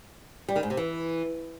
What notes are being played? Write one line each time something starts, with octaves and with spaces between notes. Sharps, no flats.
G3
D#3
G#2
C3
E3